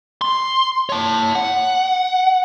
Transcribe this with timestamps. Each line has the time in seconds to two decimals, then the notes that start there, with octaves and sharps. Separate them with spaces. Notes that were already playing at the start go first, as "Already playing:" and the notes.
0.21 C6
0.89 C#5 A5
1.35 F#5